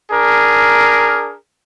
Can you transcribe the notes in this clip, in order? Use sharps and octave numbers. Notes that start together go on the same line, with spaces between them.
D4 G#4 A#4